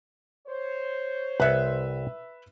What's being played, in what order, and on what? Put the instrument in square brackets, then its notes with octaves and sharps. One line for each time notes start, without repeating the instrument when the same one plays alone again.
[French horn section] C5 C#5
[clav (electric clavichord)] C2 F#5 [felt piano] B4 E5